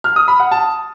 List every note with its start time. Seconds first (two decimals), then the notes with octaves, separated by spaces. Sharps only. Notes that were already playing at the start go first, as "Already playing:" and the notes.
0.04 F6
0.16 D#6
0.28 B5
0.40 F#5
0.51 A5